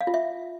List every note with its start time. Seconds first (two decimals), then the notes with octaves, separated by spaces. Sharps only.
0.01 F5
0.07 F4
0.14 E5